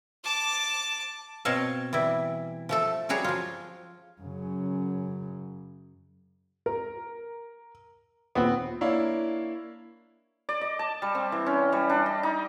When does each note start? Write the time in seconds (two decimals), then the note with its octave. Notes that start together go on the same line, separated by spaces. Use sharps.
0.24 A5 D6
1.45 B2 C4 C#5 D#5 F5 A5
1.93 E3 G3 E4
2.69 F3 A3 A4
3.09 F#3 G3 F#4 G#4 C#5
3.24 F3 F4
4.22 F#2 C#3
6.66 A#4
8.35 D#2 A#2 B3 C4 B5
8.81 A#3 D4 E4 C#5 F5
10.49 D5
10.61 D#5
10.79 A5
11.02 G3
11.15 C4
11.32 E3
11.46 C#4
11.72 G3
11.89 D4
12.06 D#5
12.23 D#4